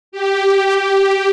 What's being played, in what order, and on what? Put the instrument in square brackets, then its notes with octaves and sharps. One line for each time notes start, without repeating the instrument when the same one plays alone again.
[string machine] G4